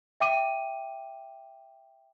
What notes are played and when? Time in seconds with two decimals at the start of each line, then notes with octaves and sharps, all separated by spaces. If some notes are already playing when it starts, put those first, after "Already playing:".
0.20 E5 G5 D6 D#7